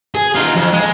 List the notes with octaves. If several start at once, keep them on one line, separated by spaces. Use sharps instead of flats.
G#4
D#4 F4
F2
G#3